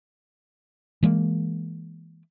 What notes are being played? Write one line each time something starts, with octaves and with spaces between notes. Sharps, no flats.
E3 G#3 A#3